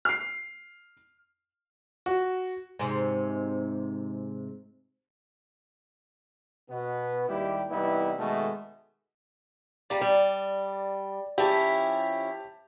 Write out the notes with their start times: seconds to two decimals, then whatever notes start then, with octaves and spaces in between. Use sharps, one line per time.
0.05 F6 C7
2.06 F#4
2.79 G#2 C3
6.69 B2 B3
7.28 G#1 D#2 G3 E4 G4
7.70 C2 E3 G3 B3 D#4 E4
8.18 B2 D#3 G#3 A3
9.90 G3 A#3 D5
10.01 G3
11.38 F3 C#4 E4 G4 A5